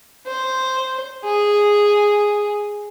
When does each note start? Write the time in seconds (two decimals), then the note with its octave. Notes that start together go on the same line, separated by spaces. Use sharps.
0.26 C5
1.24 G#4